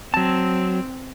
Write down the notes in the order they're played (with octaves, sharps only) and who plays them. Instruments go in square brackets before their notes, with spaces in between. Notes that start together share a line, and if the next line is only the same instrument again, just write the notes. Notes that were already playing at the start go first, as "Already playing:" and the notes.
[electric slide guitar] F#3 A5 [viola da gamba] C4